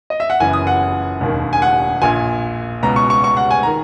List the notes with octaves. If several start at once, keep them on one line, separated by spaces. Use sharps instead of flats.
D#5
E5
F#5
F#1 F#2 E3 G#5
D#6
F#5
E1 D#2 D#3
G#5
F#5
A#1 A#2 G#5
C#2 B2 A#5
C#6
C#6
C#6
F#5
G#5
D#3 A#5